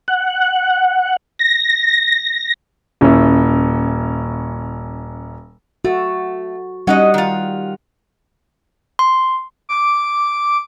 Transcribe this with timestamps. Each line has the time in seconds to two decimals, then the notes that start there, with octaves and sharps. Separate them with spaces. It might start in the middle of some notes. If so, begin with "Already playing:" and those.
0.08 F#5
1.39 A#6
3.01 D#1 C#4 E4
5.85 A3 F#4
6.87 G3 C#4 D#4 D#5 F#5
7.14 D#3 F4
8.99 C6
9.69 D6